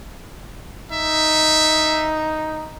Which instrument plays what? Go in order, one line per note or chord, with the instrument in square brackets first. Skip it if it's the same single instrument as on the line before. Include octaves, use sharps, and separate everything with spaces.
[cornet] D#4 [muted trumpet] E5